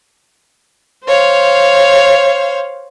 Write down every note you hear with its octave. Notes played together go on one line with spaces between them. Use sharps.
C5 C#5 F5